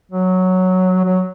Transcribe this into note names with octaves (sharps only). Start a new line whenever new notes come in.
F#3
F#3